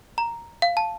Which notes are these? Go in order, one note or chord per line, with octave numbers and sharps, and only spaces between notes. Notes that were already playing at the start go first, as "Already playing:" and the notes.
A#5
F5
A5